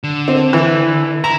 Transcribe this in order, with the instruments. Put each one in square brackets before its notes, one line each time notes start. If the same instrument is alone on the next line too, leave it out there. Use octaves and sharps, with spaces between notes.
[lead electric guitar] D3
[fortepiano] C4
E3
[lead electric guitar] E4 [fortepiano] A#5